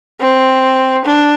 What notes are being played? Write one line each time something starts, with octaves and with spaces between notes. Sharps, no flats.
C4
D4